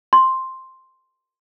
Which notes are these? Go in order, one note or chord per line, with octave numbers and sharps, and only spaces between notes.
C6